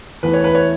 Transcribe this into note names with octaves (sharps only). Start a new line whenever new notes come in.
E2 E3 A3 B4
C#5
B4
C#5